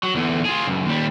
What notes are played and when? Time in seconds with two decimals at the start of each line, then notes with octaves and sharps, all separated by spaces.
0.03 F#3
0.15 E2 D3
0.45 F4 G#4
0.67 C#2 F#2
0.86 D#2 G3